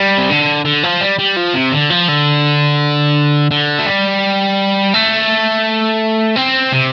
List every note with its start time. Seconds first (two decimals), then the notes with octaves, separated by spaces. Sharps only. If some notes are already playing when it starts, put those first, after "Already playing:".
Already playing: G3
0.18 C3
0.30 D3
0.65 D3
0.83 F3
1.01 G3
1.19 G3
1.37 F3
1.54 C3
1.72 D3
1.90 F3
2.08 D3
3.51 D3
3.78 A3
3.86 G3
4.94 A3
6.36 C4
6.72 C3